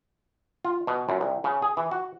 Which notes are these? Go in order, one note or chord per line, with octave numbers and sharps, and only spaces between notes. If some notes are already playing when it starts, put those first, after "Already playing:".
F4
B2
F#2
C2
C#3
G#4
E3
F#4